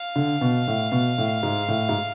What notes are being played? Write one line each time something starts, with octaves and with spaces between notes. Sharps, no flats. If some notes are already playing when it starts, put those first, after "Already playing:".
Already playing: F5
D3
B2
A2
B2
A2
G#2
A2
G#2